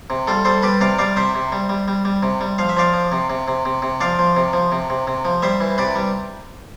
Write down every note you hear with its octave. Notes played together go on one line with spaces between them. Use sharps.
C3
G3 F4 A4
G3 A4 C5
G3 B4 D5
C3 D5 F5
G3 D5 F5
C3 C5 E5
C3
G3
G3
G3
G3
C3
G3
F3 F5
E5
F3 D5 F5
F3
C3
C3
C3
C3
C3
F3 D5 F5
F3
C3
F3
C3
C3
C3
F3
G3 C5 E5
E3
C3 B4 D5
G3